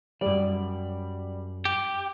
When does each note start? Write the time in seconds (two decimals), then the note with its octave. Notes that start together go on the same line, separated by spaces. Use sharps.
0.21 F#2 G3 D5
1.65 G4